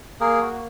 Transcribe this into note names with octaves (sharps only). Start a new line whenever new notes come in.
A#3 G#4 A#4
F#4